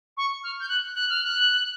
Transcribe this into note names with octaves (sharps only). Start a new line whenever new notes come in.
C#6
F6
G6
F#6
F#6
F6
F#6